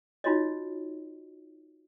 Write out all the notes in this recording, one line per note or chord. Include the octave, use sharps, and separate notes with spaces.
D#4 F4 F#4 C#5 D#5